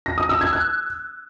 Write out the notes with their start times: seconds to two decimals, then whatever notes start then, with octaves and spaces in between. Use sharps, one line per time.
0.06 A#6
0.18 D#6
0.29 E6
0.41 G#6
0.53 F#6